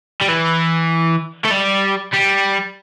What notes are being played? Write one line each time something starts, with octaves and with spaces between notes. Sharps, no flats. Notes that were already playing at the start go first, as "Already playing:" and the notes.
G3
E3
A3
G3
G3